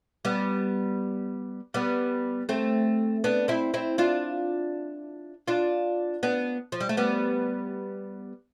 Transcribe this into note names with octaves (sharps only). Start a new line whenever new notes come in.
G3 B3
G3 B3
A3 C4
B3 D4
C4 E4
C4 E4
D4 F4
D4 F4
B3 D4
F3
G3
A3
G3 B3